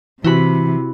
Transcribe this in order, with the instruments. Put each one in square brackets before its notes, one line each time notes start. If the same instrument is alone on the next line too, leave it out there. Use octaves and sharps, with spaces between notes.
[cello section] C3 [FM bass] E3 [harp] E4 F#4 B5